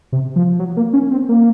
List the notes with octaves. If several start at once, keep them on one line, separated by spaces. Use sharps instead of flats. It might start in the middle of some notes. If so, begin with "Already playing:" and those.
C3
F3
F#3
A#3
C#4
C4
A#3